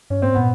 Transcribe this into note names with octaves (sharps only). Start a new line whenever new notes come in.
G2 C#4
G#2 C4
A#2 B3